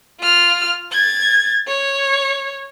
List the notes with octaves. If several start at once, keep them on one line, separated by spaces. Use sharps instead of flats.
F4 F6
G#6 A6
C#5